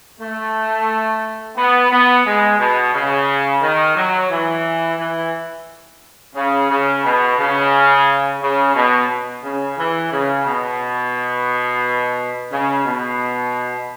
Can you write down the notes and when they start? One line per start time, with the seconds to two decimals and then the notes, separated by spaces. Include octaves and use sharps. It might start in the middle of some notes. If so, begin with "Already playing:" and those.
0.20 A3
1.57 B3
1.90 B3
2.25 G#3
2.58 B2
2.93 C#3
3.62 D#3
3.96 F#3
4.31 E3
4.98 E3
6.35 C#3
6.70 C#3
7.04 B2
7.39 C#3
8.41 C#3
8.75 B2
9.43 C#3
9.78 E3
10.12 C#3
10.46 B2
12.51 C#3
12.86 B2